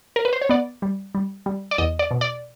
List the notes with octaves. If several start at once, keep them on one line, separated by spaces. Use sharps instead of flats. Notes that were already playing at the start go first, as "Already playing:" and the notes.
A#4
B4
C5
C#5
B3 D5
G3
G3
G3
D5
E2 D#5
D5
B2
D5